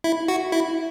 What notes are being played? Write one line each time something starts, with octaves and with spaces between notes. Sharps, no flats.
E4
F#4
E4